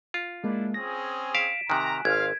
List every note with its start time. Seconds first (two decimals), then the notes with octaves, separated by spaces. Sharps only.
0.14 F4
0.44 G#3 A#3 D4 E4
0.74 C4 C#4 G#4 A#6
1.35 F5 B6 D7 E7
1.70 C3 D#3 G#5 A#5 F#6
2.05 G#1 F4 F5 G#6